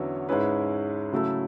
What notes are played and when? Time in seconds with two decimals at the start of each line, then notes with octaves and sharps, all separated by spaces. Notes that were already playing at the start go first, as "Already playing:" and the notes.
Already playing: E2 D3 F#3 C#4 E4
0.29 G#2 G#3 C#4 E4 B4
1.12 C#3 F#3 A3 E4 A4